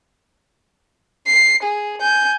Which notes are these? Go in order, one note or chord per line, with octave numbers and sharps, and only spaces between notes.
C7
G#4
G#5 G6